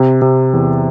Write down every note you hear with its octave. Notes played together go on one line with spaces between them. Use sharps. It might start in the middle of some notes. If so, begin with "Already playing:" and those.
Already playing: C3
C3
E2